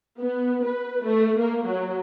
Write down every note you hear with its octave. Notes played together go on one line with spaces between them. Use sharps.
B3
B4
A3
A#3
F#3